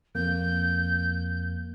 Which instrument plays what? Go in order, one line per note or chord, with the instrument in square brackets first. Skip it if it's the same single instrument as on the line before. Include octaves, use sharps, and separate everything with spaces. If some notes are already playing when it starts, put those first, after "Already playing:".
[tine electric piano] F2 A#3 [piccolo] G6